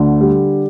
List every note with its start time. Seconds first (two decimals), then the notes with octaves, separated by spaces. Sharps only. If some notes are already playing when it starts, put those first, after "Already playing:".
Already playing: D2 D3
0.21 G3